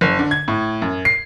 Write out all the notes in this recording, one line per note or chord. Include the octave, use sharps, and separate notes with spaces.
F#1
D3
G#6
A2
F#2
C7